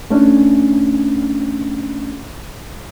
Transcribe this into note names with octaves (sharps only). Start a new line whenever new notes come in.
A3 C#4 D4